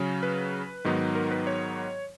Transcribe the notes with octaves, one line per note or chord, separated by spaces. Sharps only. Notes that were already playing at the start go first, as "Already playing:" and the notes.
Already playing: C#3 F#3 C#4
B4
G#2 D#3 F#3 B3 D#4
A#4
B4
C#5